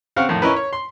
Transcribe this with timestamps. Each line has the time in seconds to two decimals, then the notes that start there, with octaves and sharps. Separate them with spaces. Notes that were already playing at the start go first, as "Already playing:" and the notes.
0.16 C#3 C4 F5 F#5 C#6
0.29 F2 A2 D#3
0.42 C#4 D#4 E4 A#4 B4
0.56 C#5
0.73 C6